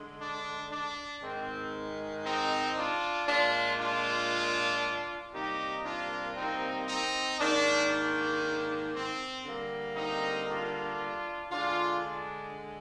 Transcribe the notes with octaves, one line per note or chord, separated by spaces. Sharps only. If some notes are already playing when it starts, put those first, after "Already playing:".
Already playing: D3 G#3
D4
D4
G#2 D#3 G#3 C4
C4 D#4
D4 F4
A#2 G#3 D4 F4
D4 F4
C3 G3 A#3 D#4 G4
D4 F4
C4 D#4
C4 D#4
G#2 D#3 A#3 D4
D4
C4
D3 G3 A#3
C4 D#4
D4 F4
D3 G#3 D4 F4
D4